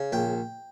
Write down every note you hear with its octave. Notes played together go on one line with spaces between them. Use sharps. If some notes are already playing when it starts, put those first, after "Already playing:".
Already playing: C#3
A#1 G5